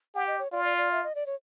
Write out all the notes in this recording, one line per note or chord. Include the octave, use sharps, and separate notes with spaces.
G4 F#5
D#5
C#5
F4 D5
D5
D5
E5
D#5
D5
C#5